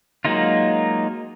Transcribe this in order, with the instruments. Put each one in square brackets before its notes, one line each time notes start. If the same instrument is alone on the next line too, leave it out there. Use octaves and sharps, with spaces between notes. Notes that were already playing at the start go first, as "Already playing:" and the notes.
[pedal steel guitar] F#3 G#3 A#3 D#4 F4